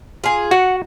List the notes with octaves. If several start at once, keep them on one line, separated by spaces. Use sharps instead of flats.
F4 G#4
F#4 F#5